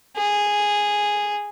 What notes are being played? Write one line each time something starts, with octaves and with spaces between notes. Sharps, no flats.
G#4